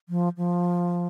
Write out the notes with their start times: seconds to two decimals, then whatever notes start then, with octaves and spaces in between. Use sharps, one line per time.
0.09 F3
0.37 F3